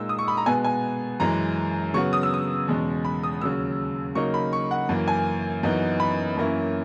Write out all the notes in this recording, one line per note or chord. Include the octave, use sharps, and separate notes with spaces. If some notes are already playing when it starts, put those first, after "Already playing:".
Already playing: A#2 G#3 D#4 E6
D#6
C#6
B5
A#5
B2 G#3 B3 G#5
G#5
F#2 E3 G#3 A#5
C#3 F#3 B3 C#6
D#6
E6
D#6
E2 B2 G#3 C#4
B5
D#6
D#2 C#3 F#3 C#4 E6
C#3 F#3 A#3 D#4 C#6
B5
C#6
F#5
F#2 E3 A#3
G#5
F#2 E3 B3 D#4
B5
F#2 E3 A#3 C#4 E4